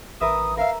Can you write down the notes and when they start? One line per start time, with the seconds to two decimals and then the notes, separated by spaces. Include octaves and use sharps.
0.21 A1 A#4 B4 E5 D#6
0.57 A#4 E5 F5